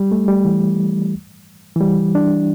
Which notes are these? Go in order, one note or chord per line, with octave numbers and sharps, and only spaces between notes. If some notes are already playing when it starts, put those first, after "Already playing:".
Already playing: G3
A3
G3
E3
E3
G3
D4